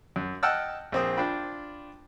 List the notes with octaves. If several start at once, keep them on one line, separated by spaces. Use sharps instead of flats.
F#2
D#5 F#5 G5 A5 E6 F6
A#1 C4 D#6
D4 F4 G5 B5